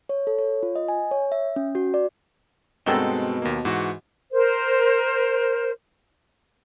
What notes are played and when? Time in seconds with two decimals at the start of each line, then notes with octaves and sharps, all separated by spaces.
0.09 C#5
0.27 A4
0.39 C#5
0.63 F4
0.76 D#5
0.88 G#5
1.11 C#5
1.32 E5
1.56 C#4
1.75 F#4
1.94 D5
2.86 G2 B2 D#3 F#3 G#3 C4 A4
3.42 D#2 A#3
3.65 G#2 E3 F#4
4.32 A#4 C5